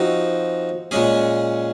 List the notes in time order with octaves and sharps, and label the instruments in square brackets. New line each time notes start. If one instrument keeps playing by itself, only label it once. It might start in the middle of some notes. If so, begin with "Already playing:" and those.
Already playing: [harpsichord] F3 C4 D#4 F#4
A#2 G#3 C#4 G#4